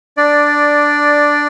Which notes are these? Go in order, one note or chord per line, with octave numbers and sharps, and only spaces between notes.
D4 D5